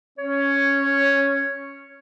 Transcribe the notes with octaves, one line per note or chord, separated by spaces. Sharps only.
C#4 C#5